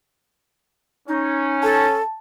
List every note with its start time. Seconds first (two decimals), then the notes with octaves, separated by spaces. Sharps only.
1.08 C#4 D#4
1.63 A4 A5